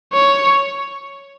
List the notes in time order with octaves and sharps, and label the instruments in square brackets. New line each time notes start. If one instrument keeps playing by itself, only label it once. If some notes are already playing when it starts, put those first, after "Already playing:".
[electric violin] C#5